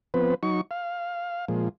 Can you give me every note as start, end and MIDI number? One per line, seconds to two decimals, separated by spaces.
0.14 0.34 53
0.14 0.34 59
0.14 0.34 60
0.14 0.34 71
0.43 0.61 54
0.43 0.61 63
0.43 0.61 85
0.71 1.45 77
1.48 1.69 46
1.48 1.69 53
1.48 1.69 56